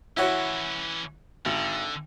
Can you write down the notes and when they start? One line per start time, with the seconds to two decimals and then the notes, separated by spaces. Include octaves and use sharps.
0.17 E3 C#4 E4 F#4 C#5
1.45 G#1 D3